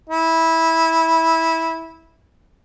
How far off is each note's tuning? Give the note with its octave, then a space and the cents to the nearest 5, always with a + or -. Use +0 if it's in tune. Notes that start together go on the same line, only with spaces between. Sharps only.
E4 -15